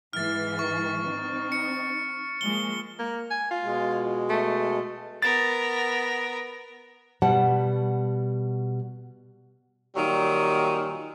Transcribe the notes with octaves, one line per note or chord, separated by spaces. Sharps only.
G#2 E3 G#3 F6 A6
C#6
C4 D#4
C#7
F3 G#3 A#3 G7
A#3
G#5
F4
B2 G#3
A3
B3 A#4 A6
B2 G3 F#5 A5
A#2 D#3 F#3 G3